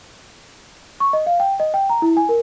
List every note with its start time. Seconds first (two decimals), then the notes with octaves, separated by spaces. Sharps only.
1.00 C#6
1.13 D#5
1.26 F5
1.40 G5
1.60 D#5
1.74 G5
1.89 A#5
2.02 E4
2.17 G#5
2.29 A#4